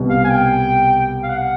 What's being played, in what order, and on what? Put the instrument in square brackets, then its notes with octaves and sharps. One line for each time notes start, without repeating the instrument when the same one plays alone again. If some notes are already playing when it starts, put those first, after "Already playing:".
Already playing: [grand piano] C2 B2 G3
[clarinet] F5
G#5
G5
F5
F#5